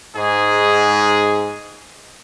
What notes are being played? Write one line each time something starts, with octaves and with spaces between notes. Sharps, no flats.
G#2 G#4